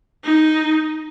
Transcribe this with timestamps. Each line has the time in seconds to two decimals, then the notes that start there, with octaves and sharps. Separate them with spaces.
0.24 D#4